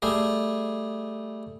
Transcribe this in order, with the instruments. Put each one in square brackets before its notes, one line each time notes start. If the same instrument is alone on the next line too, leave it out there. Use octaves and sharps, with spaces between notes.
[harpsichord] G3 A3 G#4